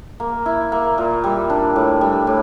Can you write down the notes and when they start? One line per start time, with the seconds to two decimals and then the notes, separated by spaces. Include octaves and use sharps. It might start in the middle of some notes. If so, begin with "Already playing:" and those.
0.20 A#3
0.46 E4
0.72 A#3
0.98 A#2
1.24 G3
1.50 D4
1.76 A2
2.01 G3
2.27 A2